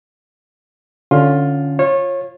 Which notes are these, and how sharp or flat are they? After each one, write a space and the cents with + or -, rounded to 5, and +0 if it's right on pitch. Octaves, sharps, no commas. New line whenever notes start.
D3 +0 C#4 +0 F4 +10
F4 +0 C#5 -25